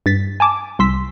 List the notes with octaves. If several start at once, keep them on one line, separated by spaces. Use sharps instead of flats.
G2 A6 B6
G#5 A5 D6
C2 C6 E6 B6